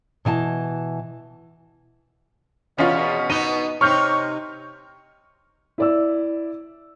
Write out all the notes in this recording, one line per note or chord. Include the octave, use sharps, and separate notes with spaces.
B2 E3 G#5 A5
E2 B2 C#4 F4
B3 D#4 D#5 D#7
C3 D#4 C#5 C#6 F6 G6
E4 D5 E6